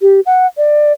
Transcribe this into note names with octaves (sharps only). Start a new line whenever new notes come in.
G4
F#5
D5